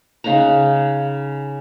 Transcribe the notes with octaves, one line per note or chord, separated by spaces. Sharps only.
C#3 D#4 F#5 A#5